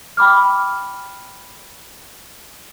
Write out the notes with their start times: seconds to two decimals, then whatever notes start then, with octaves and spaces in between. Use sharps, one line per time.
0.17 G5 B5 D6 F6